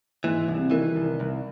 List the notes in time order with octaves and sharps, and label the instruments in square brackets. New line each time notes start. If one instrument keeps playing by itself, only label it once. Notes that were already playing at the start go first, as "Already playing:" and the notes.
[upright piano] G#2 [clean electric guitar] E3
[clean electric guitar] C2
[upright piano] C3
[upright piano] D#3 [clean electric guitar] E3
[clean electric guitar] C2
C2